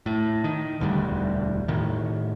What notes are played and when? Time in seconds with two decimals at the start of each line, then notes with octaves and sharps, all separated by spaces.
0.06 A2
0.44 D#3
0.80 E1 D2 D3 G3
1.68 A2 D#3